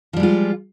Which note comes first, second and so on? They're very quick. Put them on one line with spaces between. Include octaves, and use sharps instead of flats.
F3 G3 G#3 F4